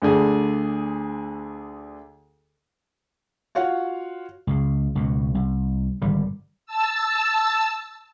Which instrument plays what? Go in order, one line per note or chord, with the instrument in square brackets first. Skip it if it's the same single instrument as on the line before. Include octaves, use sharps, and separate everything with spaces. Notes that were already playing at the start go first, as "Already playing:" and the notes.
[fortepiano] D2 D3 G#4
[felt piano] F4 F#4 C#5 F5 F#5
[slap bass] C#2 C#3
C#2 B2
C2
G#1 D3 G3
[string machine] A5 E6